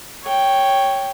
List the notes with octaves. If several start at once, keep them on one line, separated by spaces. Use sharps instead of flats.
C#5 G5